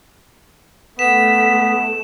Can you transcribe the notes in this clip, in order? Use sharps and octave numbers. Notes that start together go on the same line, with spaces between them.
A3 B3 B6 E7